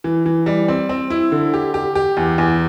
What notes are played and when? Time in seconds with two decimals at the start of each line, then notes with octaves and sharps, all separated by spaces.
0.04 E3
0.26 E3
0.46 G3
0.68 C4
0.89 C4
1.10 E4
1.32 D3
1.54 G4
1.74 G4
1.95 G4
2.17 E2
2.38 E2